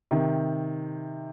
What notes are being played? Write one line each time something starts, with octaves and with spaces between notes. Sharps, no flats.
C3 D#3